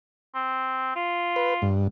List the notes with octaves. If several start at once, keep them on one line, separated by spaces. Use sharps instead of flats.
C4
F4
B4
G2